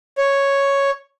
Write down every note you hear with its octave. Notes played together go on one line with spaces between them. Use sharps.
C#5